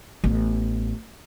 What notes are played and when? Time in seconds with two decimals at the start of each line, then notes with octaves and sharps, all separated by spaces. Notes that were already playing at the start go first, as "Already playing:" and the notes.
0.24 A1 B3